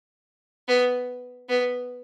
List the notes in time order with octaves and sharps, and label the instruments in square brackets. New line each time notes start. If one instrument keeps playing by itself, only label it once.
[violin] B3
B3